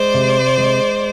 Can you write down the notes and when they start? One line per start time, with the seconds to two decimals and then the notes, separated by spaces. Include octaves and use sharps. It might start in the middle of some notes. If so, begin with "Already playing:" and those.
Already playing: G#3 C5 D5
0.14 C3
0.58 G#3